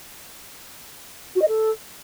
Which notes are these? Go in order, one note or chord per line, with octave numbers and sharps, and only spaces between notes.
F#4
D#5
A4